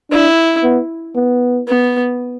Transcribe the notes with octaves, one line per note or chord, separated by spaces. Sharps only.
D4 E4
B3
B3
B3